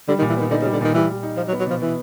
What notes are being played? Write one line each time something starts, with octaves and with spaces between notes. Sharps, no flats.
D3 G3
D#3
A#2
E3
D#3 B3
D3 D#4
C#3
G3
D3
A#2 D#3
E3 G3
G3
D#4
F3 D#4
F#3
B3
F#3
B2 F3
E3 B3